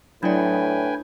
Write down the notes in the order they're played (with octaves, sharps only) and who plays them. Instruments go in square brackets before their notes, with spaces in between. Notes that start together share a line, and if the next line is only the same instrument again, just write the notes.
[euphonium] A2 [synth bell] F#3 E4 D5 [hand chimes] D4 [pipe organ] B4 G5 G#5